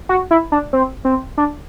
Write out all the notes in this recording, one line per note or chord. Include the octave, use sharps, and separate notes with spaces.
F#4
E4
D4
C4
C4
D4